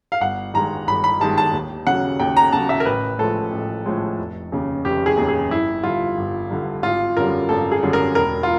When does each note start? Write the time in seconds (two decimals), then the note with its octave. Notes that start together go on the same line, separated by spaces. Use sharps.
0.12 F5
0.21 G1 F#5
0.54 G2 D#3 G#3 A#5
0.87 G1 B5
1.04 B5
1.20 G2 D#3 G#3 A5
1.38 A5
1.53 D#2
1.87 C#3 F#3 F#5
2.20 D#2 G5
2.37 A#5
2.53 C#3 F#3 A5
2.69 E5
2.80 A#4
2.85 A1 B4
3.18 A2 F3 G#3 A4
3.53 A1
3.86 A2 F3 G#3
4.19 F1
4.52 D#2 C#3
4.85 F1 G4
5.06 G#4
5.17 D#2 C#3
5.28 G#4
5.51 G1 E4
5.83 G2 D3 F4
6.18 G1
6.51 G2 D3
6.83 G#1 F4
7.17 F#2 D3 G3 A#4
7.49 G#1 A4
7.72 G#4
7.83 F#2 D3 G3
7.93 A#4
8.15 E1 A#4
8.43 F4